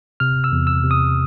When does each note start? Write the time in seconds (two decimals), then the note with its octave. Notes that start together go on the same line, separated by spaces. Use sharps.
0.20 C3 F6
0.44 E6
0.52 E2
0.67 E6
0.83 C3
0.91 D#6